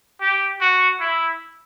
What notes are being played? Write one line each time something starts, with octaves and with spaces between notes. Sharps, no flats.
G4
F#4
E4